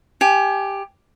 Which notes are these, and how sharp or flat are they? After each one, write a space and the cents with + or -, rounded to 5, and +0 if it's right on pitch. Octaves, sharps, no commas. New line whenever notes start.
G4 +10 G#5 +25